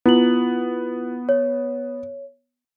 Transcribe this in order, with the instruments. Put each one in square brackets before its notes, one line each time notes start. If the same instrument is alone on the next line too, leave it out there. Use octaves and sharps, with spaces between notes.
[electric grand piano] B3 [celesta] E4 F4 F#7
[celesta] C#5